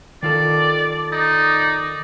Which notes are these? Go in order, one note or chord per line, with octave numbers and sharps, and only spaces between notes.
D#3 F4 A4 D5
D#4 D5